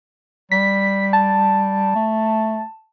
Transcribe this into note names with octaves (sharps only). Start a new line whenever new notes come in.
G3 B6
A5
A3